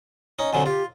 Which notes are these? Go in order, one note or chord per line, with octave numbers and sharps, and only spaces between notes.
C#4 D#4
F2 D3 F#3 G#5
F4 G4